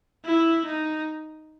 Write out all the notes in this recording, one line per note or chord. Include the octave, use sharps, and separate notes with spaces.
E4
D#4